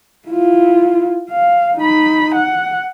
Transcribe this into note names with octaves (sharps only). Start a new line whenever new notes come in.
E4 F4
F5
D#4 B5
F#5